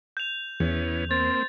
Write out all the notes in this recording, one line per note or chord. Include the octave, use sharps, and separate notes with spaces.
G6 F7
E2 E3 B3 C#4
A#3 C4 C5 A6